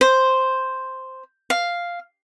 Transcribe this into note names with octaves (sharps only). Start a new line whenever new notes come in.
C5
F5